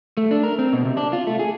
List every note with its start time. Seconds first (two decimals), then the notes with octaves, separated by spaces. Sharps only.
0.17 A3
0.31 D4
0.43 A#4
0.59 C4
0.73 B2
0.85 C3
0.97 D4
1.13 F4
1.27 A3
1.40 G#4